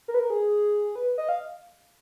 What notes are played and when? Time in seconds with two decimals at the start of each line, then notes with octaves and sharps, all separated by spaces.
0.08 A#4
0.14 B4
0.19 A#4
0.30 G#4
0.96 B4
1.18 D#5
1.29 F5